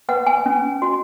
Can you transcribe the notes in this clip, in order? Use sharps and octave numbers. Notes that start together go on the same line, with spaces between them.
B4 F#5
G#5
C#4
F#4